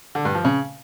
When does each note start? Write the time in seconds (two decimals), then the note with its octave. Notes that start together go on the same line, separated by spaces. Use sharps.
0.15 D3
0.25 G2
0.35 F3
0.45 C#3